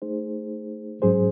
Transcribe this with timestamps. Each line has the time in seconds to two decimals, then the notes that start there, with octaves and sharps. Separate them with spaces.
0.02 A3 D#4 G#4 C5
1.02 G#2 F#3 C#4 G#4 C5